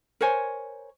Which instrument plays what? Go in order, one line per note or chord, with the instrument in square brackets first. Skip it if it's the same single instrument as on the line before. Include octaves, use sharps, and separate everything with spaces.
[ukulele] A#4 C5 C#5 G#5